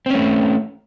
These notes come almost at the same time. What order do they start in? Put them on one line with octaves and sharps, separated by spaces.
C4 C#4 A3